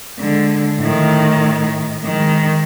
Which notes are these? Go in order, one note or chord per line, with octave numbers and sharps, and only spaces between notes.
D3 G#3
A2 D#3
D#3 G#3